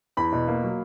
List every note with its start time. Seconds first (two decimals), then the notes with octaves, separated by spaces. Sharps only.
0.17 E2 B5
0.32 B2
0.48 A#3
0.64 F#3